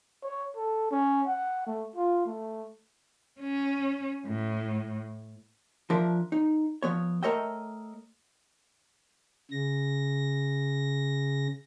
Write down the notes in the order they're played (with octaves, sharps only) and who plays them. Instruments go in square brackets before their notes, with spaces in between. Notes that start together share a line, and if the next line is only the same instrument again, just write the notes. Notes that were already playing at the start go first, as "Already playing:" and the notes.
[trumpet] C#5
A4
C#4
F#5
A3
F4
A3
[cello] C#4
A2
[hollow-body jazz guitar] F3 D4 A#4 E5
D#4
F3 B3 C#5
A3 A#4 C#5 D#5 E5 G5
[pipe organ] C#3 A#6